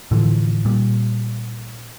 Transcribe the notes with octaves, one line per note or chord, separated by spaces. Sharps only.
A2 D3 E3 F3
A#2 G3